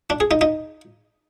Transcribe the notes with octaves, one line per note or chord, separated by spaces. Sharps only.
D4
G#4
D#4
D#4